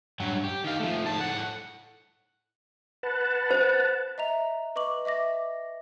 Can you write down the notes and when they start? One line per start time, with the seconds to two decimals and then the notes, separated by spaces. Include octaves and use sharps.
0.20 G2 F#3
0.44 G4
0.64 D#3 F5
0.80 F3 A3
1.04 G#2 A5
1.20 A2 F#5
3.03 B4 F#5 A5
3.51 C5
4.18 D#5 E5 A#5 F7
4.76 B4 D#5 C#6 D6 F#7
5.05 D#5 E5 D6 A#6